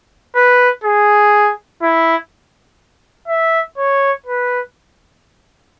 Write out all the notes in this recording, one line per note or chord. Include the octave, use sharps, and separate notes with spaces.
B4
G#4
E4
E5
C#5
B4